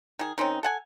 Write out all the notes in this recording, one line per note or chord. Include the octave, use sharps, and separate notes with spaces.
D#3 G#4
D#3 C4 C#4 D#4
A4 F#5 G#5